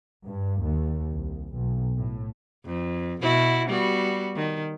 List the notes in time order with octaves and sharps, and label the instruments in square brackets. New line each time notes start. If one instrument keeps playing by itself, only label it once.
[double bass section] G2
D#2
C2
B1
A2
[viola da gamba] F2
B2 E4 F#4
G3 B3 F#4
D#3